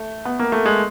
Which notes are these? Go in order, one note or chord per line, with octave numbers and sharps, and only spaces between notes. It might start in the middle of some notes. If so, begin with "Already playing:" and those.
Already playing: A3
B3
A#3
A3
G#3